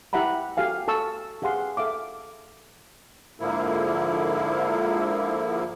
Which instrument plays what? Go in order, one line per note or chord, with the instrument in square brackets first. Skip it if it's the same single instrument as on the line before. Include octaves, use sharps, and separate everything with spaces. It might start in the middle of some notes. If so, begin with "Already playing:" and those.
[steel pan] E4 G4 E5 F#5 A#5 B5
F#4 G4 A4 F5 G#5
A4 A5 C#6 E6
G4 G#4 F5 F#5 C6
A4 E5 F5 D6
[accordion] G#2 D3 F3 A#3 E4